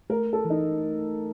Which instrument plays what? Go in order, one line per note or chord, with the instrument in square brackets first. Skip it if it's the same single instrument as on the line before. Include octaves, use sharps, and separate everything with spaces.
[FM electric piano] A3 [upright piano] A#4
[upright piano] A4
[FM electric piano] E3
[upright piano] D#4